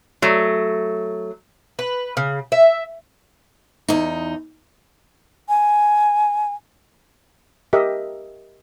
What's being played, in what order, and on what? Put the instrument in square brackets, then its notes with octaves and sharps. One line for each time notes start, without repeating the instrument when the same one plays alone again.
[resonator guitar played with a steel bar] F#3 A3
[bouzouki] B4
C#3
E5
[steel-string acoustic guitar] E2 D#4
[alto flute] G#5
[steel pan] G4 A#4 D#5 E5